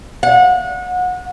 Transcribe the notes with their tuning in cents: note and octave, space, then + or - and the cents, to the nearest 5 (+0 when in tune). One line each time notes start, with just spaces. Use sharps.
F#5 -30